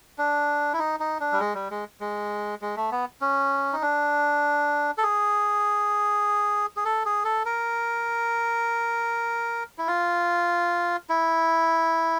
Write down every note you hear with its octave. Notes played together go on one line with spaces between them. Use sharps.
D4
E4
D#4
D#4
D4
G3
G#3
G3
G#3
G#3
G#3
A3
B3
C#4
D#4
D4
A4
G#4
G#4
A4
G#4
A4
A#4
E4
F4
E4